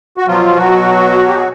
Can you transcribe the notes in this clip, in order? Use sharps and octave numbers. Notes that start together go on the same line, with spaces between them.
F#4
B2 F3 F#3 F4
F#3 F#4
G4
G#4